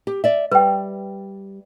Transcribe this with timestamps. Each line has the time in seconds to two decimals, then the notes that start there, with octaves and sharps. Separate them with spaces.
0.07 G4
0.24 D5 E5
0.51 G3 B4 G5